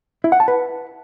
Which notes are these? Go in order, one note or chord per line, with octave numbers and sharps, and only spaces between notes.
E4
F#5
A5
B4